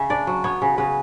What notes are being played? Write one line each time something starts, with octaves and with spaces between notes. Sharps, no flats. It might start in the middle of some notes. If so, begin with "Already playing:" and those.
Already playing: C#3 E5
D4 D5
F#3
B3 C#5
C#3
C#3 B4